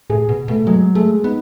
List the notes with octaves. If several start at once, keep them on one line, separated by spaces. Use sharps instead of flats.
A2 G#4
B2
B2 A3
F#3 G#3
G#3 A3
B3 D#4